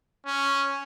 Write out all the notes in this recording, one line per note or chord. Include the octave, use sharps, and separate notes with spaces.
C#4